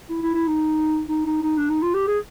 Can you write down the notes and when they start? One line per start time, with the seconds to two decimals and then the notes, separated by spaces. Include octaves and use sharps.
0.10 E4
0.22 E4
0.34 E4
0.47 D#4
1.08 D#4
1.25 D#4
1.42 D#4
1.57 D4
1.70 D#4
1.82 F4
1.94 G4
2.07 G#4